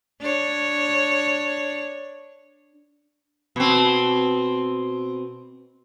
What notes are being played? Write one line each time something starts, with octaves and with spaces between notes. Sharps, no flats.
D4 C#5
B2 C4